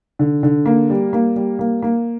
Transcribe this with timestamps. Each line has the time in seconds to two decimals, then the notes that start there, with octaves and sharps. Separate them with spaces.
0.19 D3
0.43 D3
0.66 A#3
0.90 G3
1.13 A#3
1.36 G3
1.59 A#3
1.82 A#3